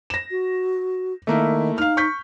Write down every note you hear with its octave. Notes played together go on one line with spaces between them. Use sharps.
A#6 E7
F#4
D#3 A3 A#3 E4
D#4 F5 F6
C#6 G6 B6